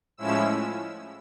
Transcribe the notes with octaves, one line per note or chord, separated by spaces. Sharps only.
A2 F3 G#3 C#4 E4 E6